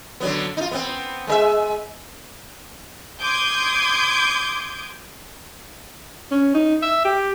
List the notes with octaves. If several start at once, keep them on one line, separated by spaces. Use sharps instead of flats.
D3 F#3 B3
D#4 F4
B3 C4
G#3 A#4 E5
C6 D6 D#6 G6 G#6
C#4
D#4
E5
G4